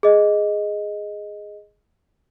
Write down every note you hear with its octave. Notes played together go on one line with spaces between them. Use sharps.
G#4 D#5